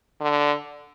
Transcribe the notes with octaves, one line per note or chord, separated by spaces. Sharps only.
D3